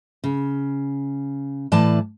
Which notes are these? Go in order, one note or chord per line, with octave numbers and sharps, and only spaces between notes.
C#3
A2 E3 D5 A5